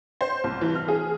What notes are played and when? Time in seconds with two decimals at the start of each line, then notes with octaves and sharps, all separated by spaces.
0.21 C5
0.44 C2
0.61 E3
0.75 F6
0.88 G#4